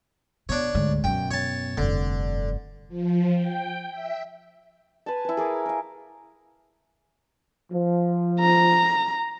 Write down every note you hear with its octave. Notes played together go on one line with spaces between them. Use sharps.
B2 D4 C#5
D2 G#2
F#2 B2 G5
C#5 A5
F1 G2 D3
F3
G5
E5
B4 G#5 A5
E4 B4
G#4 A#4 D6
A#4 F5
F3
A#5